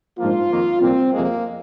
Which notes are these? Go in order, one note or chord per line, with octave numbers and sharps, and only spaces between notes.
A#1 G#2 F3 A#3 F4
F2 D#3 A#3
C2 A#2 A#3 C4
F2 C3 G#3 A#3